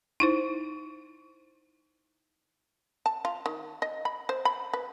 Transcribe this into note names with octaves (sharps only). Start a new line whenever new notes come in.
D#4 E4 C5
A5
F4
D#3
D#5
B5
C5
B5
B4